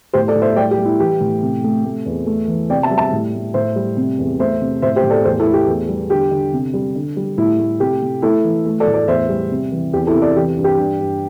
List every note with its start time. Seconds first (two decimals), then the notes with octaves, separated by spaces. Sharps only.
0.13 A2 G4 C5
0.28 A4 D5
0.35 A2
0.42 C5 E5
0.56 G3 D5 G5
0.71 G4
0.78 G3
0.85 E4
0.99 E3 G4
1.21 A2
1.42 C3
1.64 A3
1.85 A3
2.06 E2
2.26 A3
2.48 E3
2.69 C3 D5 G5
2.83 E5 A5
2.91 G3
2.98 E5 A5
3.13 A2
3.34 A3
3.54 A2 C5 E5
3.76 G3
3.97 C3
4.19 E2
4.39 A3 C5 E5
4.61 C3
4.82 A2 C5 E5
4.96 G4 C5
5.04 A2
5.10 A4 D5
5.25 E2 G4 C5
5.39 E4 A4
5.47 A3
5.53 G4
5.67 E2
5.88 G3
6.09 D3 G4
6.31 D3
6.53 C3
6.73 G3
6.95 D3
7.16 G3
7.38 A2 E4
7.59 A3
7.80 C3 G4
8.02 C3
8.22 A3 E4 A4
8.44 E3
8.65 A3
8.80 A4 D5
8.87 A2
8.94 A4 D5
9.07 E2 C5 E5
9.29 G3
9.51 C3
9.72 E3
9.93 E2 G4
10.07 E4 A4
10.14 C3
10.22 A4 D5
10.36 E3 G4
10.57 G2
10.64 G4
10.78 G2
11.00 G2